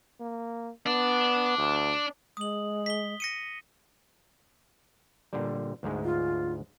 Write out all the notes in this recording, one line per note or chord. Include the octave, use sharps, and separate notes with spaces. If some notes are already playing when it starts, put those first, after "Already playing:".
A#3
B3 D4 D5
D2
G#3 D#6 F#7
B6 G7
A#6 C#7 D#7
A#2 D3 G3
D2 G#2 G#3
F4